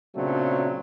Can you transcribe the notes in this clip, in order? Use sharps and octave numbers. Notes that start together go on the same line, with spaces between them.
A#2 C#3 F#3 A3 C4 D4